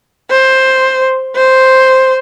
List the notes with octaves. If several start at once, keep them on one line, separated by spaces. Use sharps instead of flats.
C5
C5